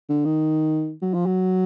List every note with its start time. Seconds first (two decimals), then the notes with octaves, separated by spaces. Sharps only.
0.09 D3
0.25 D#3
1.02 F#3
1.14 F3
1.26 F#3